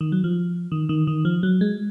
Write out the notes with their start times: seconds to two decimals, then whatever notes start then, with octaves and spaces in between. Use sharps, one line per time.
0.01 D#3
0.12 F#3
0.24 F3
0.72 D#3
0.89 D#3
1.07 D#3
1.25 F3
1.43 F#3
1.61 G#3